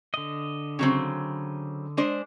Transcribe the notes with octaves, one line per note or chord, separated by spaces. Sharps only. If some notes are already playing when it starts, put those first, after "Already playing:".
D3 D#5
C#3 F#3 C4
G#3 D4 C5